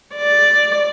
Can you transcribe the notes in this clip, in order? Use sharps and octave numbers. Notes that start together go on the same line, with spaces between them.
D5